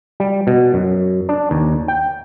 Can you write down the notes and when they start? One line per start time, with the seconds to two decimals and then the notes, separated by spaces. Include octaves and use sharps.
0.20 G3
0.47 B2
0.74 F#2
1.29 D4
1.51 D#2
1.88 G5